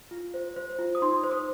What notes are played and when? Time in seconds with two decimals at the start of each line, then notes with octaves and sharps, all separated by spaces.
0.11 F4
0.34 C5
0.56 C5
0.79 F4
0.95 D#6
1.02 D#4 C6
1.23 C5
1.31 D#6